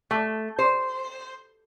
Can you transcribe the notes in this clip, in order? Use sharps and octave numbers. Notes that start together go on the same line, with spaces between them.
A3
C5